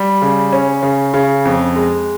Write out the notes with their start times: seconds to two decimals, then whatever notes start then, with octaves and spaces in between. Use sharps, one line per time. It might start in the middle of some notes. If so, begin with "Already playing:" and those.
Already playing: G3
0.22 C#3
0.52 C#4
0.83 C#3
1.14 C#3
1.45 F2
1.76 G#3